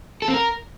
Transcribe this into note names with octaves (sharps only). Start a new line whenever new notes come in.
A4
C4
A#4